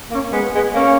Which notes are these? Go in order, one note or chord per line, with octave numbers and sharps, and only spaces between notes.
A#3 C#4
G#3 B3
G#3 B3
A#3 C#4